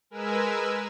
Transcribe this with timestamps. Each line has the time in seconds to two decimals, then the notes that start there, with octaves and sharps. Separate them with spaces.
0.10 G#3 A#4 B4 G#5 E6